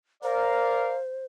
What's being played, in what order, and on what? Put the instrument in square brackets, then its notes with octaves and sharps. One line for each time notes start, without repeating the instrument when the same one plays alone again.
[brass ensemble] A#4 D5 F5 [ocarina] C5